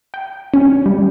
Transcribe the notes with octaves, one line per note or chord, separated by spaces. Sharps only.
G5
C#4
G3